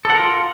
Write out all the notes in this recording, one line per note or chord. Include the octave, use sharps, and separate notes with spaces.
F4 A4 A#4 F#5